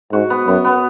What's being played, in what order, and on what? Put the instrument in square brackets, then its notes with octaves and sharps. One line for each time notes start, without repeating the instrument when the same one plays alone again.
[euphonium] G#2 [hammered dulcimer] F#4
[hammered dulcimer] B3
[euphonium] F#2 [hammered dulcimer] B3
[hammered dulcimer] B3